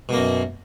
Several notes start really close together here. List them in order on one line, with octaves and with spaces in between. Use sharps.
B2 A#3 F#2